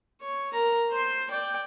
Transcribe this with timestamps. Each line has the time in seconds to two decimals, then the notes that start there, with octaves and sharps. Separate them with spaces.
0.22 C#5
0.53 A#4 A#5
0.91 C5 C6
1.30 D5 G5